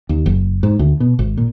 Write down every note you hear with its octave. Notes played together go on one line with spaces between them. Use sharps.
D#2
F#1
G#2
D2
B2
G#1
A#2